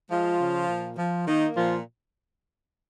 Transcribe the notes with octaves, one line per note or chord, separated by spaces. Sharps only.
F3 G#3 F4
C#3
A#2
F3
D#3 A#3 D#4
A#2 F3 F4